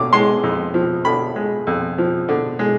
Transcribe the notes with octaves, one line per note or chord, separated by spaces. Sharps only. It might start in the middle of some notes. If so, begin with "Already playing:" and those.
Already playing: D3 D6
G#3 C6
F2
F3
D3 B5
G#3
F2
F3
D3
G#3